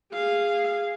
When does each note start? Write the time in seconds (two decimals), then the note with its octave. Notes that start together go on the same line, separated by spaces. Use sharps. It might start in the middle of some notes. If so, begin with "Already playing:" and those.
0.13 G#4 F5